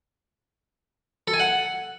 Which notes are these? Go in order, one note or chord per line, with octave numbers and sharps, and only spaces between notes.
A4
G#5
F#5